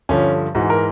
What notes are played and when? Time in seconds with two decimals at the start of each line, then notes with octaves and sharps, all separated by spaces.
0.09 G2 D3 F3 C#4
0.55 G#2 E3 F#4
0.70 A#4